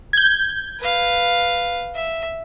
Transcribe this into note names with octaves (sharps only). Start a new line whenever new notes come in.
G6 G#6
B4 F5
E5